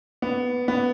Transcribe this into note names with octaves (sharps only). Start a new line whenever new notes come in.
B3
B3